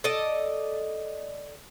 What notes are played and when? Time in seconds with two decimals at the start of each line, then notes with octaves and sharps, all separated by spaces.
0.04 A4 D5 D#5